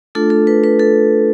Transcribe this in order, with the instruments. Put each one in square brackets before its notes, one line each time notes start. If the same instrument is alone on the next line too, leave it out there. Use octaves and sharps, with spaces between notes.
[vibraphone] A3 D4 F4 A4
A4
B4
B4
A4